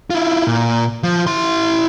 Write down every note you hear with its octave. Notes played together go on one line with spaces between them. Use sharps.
E4 F4
A#2
F3
E4 C6